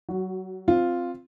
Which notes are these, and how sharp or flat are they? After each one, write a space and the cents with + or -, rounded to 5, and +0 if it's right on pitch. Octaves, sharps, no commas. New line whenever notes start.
F#3 +30 F#4 +0
C4 +0 F4 +0